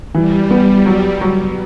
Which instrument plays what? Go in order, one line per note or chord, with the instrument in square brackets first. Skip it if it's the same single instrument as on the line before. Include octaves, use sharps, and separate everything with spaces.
[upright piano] E3 [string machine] G3
[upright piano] B3
F#3
F#3